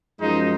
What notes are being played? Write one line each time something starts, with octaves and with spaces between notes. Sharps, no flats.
F#2 F3 G#3 D#4